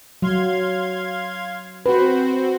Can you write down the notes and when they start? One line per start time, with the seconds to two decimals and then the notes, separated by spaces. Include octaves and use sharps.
0.22 F#3 F5 C6 G#6
1.86 C4 F#4 B4 C5